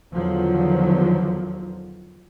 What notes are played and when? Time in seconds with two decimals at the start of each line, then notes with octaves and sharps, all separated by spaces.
0.13 E2 D3 D#3 F3 F#3